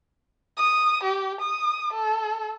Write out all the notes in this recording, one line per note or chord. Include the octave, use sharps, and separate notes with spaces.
D#6
G4
D#6
A4